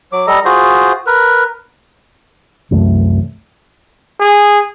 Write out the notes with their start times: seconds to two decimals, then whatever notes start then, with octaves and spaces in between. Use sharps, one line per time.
0.12 F#3 D6
0.27 G3 A4 D#5 A#5
0.45 F4 F#4 G#4 C5
1.06 A#4 B4
2.71 C2 F#2 E3 A3
4.20 G#4